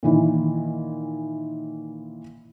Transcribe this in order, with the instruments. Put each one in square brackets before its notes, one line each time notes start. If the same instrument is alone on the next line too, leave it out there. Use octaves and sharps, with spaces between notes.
[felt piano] A#2 D#3 E3